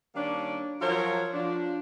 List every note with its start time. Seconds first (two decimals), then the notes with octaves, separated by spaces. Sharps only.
0.15 D#3 G3 A#3 C#4 D4
0.81 F3 F#3 F#4 A#4 C#5 F5
1.34 F3 D4